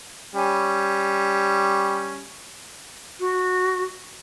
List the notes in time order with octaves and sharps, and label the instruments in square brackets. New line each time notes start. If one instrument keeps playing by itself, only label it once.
[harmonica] G3 C#4
[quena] F#4